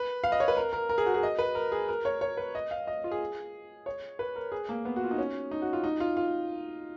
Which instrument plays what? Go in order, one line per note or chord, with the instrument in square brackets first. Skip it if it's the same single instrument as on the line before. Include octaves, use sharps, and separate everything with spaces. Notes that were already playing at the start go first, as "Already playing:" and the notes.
Already playing: [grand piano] B4
F5
D#5
C#5
B4
A#4
A#4
A#4
G#4
F#4
G#4
D#5
B4
A#4
G#4
A#4
C#5
C#5
B4
D#5
F5
D#5
F4
G#4
C#5
B4
A#4
G#4
A#3
B3
F#4
F4
D#4
C#4
D#4
F#4
F4
D#4
F4
F4